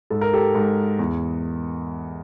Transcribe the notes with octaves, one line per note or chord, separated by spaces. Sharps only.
G#2 A4
A#4
G4 A4
G#2
E2